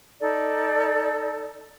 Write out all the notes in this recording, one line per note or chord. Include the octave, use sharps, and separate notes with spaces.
D#4 A4 D5